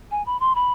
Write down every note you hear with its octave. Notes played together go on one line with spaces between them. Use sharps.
G#5
B5
C6
B5